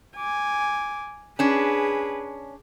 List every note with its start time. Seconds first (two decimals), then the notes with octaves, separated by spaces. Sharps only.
0.17 G#5 D6
1.39 C#4 D4 G#4 B4